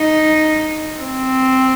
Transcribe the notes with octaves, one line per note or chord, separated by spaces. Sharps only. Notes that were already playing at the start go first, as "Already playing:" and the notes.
Already playing: D#4
C4